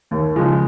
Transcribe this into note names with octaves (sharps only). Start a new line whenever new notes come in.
D#2
C#3 F3 G#3